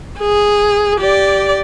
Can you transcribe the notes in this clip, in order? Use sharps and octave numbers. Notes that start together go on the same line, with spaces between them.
G#4
G4 D5